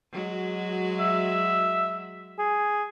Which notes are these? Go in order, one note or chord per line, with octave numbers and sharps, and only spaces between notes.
F#3 G#3 F#4
E5
G#4